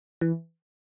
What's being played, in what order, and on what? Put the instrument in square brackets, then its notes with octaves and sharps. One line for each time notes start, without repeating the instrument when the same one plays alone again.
[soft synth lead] E3